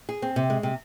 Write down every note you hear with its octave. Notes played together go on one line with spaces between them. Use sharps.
G#4
C4
C3
G#3
C3